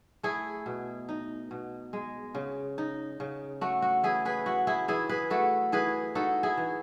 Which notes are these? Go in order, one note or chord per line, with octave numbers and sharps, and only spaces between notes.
A3 E4 G#4
B2
D#4
B2
G#3
C#3
D#4
C#3
A3 F#4
F#4
E3 E4 G#4
G#4 B4
E4 F#4
E4 G#4
E3 E4 G#4
G#4 B4
A3 F#4 A4
E3 G#4 B4
D#4 F#4 A4
E4 G#4
E3